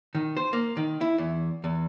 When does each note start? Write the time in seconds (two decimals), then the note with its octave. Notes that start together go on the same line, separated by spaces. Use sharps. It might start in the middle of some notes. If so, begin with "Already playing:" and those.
0.15 D#3
0.37 C5
0.53 A#3
0.77 D#3
1.01 E4
1.18 E2
1.64 E2